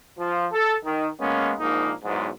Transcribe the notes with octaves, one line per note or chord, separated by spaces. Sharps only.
F3
A4
D#3
G#3 A#3 B3 C#4
A#1 G#2 A#3 D#4
B1 E2 G#2